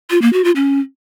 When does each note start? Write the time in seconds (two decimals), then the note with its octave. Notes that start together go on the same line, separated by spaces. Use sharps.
0.10 F4
0.22 A#3
0.33 F#4
0.44 F4
0.56 C#4